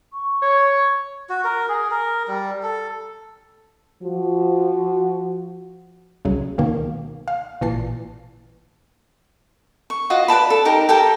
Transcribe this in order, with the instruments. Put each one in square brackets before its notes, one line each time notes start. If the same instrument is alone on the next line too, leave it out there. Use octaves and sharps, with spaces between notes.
[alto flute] C#6
[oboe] C#5
[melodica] F#4
A#4
G#4
A#4
G3
A4
[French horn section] F3 F#4
[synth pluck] C2 C#3 F#3
C#2 B2 D#3 A#3
F5
A1 A#2 E3 A5 C7
[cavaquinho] C#6
F4 F#4 D#5
B4 D5 A5 B5
A4
D#4 G4 A#4
G4 A4 A#4 G5